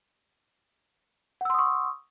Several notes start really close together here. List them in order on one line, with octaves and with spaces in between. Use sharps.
F#5 E6 C6 D#6 C#6